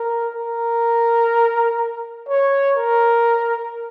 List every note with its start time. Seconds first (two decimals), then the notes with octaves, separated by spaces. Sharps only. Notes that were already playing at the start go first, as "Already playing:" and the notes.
Already playing: A#4
0.35 A#4
2.28 C#5
2.76 A#4